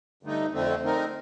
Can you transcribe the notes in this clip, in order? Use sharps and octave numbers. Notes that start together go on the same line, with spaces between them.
G2 D3 A3 D#4
F2 D3 A3 C4
D3 A3 C4 D#4 A#4